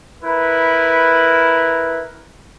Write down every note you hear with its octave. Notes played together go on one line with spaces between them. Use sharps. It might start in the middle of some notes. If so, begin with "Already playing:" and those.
E4 A#4 B4